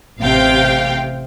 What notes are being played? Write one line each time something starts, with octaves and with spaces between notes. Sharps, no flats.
A1 C3 F5 G5